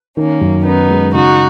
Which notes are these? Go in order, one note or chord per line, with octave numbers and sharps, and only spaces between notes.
D#3 A#3 C#4
F#2
B3 C#4 D#4
G#3
C#3 D#4 F#4